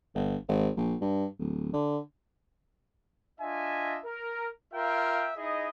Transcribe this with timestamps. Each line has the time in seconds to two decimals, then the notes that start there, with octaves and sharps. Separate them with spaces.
0.15 G1
0.48 G#1
0.77 A#1
1.01 G2
1.39 D1
1.73 D3
3.40 D4 F4 D#5 E5 G#5
4.05 A#4
4.74 F4 A#4 E5 F5 G5
5.37 D#4 E4 G#4 D#5